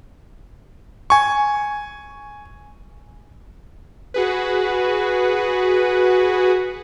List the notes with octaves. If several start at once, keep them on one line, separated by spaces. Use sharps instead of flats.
G#5 C#6
F#4 G#4 B4